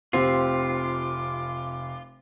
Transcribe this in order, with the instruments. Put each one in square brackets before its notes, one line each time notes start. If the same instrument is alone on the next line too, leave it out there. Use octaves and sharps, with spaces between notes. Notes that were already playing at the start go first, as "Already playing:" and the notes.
[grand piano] F1 [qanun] C4 G4 [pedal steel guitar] F4 [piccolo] D6